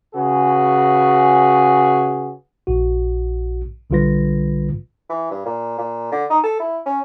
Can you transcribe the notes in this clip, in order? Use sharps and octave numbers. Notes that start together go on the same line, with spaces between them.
C#3 F#4 G#4 B4
A#1 F#4
B1 D3 G3 F4 B4 A#6
E3
G2
A#2
A#2
D3
D#4
A4
E4
C#4